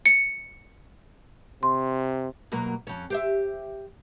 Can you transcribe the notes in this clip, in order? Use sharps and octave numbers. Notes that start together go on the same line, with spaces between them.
C#7
C3 C6
B2 F#3 A#3
F2 C#4
G4 C5 E5